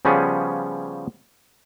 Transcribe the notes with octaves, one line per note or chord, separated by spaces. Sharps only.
C#3 F3 G3 B3 C#4 G#4